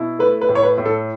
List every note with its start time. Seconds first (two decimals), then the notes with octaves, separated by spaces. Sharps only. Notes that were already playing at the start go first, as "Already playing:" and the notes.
Already playing: B2 E4
0.19 A3 B4
0.41 B4
0.49 A2
0.55 C#5
0.63 B4
0.78 A2
0.85 A4